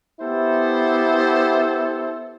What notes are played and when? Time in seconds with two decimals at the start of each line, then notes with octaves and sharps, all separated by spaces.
0.21 B3 E4 G4 A4 C5